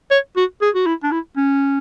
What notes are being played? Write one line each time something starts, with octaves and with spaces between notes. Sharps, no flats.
C#5
F#4
G#4
F#4
E4
D4
E4
C#4